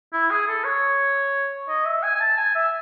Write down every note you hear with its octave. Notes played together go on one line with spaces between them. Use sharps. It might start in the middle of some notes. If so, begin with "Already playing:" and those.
E4
G#4
A4
C#5
D#5
E5
G#5
G#5
A5
G#5
E5